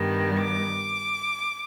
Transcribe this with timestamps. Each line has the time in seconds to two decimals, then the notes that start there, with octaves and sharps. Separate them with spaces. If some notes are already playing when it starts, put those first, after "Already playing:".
Already playing: G2 D#3 G3 B3
0.39 D6